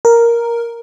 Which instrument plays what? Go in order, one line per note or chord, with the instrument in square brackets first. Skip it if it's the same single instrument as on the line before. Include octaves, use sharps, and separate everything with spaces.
[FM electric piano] A#4